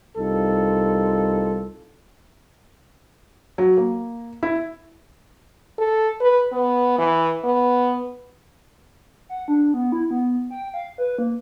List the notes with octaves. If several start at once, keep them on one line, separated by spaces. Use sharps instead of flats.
C2 D#4 F4 A4
F#3
A#3
E4
A4
B4
B3
E3
B3
F#5
D4
B3
E4
B3
G5
F5
B4
A#3